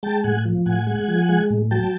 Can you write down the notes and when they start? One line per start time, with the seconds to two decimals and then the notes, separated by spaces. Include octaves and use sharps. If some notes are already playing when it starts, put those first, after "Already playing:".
0.03 G#3 G5 A5
0.24 A2 F#5 G#5
0.45 F3
0.66 A2 F#5 G#5
0.87 G#3
1.08 F3
1.29 G#3
1.50 A2
1.71 F#3 G5 A5